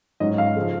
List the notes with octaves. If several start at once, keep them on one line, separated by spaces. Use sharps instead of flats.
G#2 D#3 F#3 C#4 D#5
F5
C#3 F3 G#3 C#4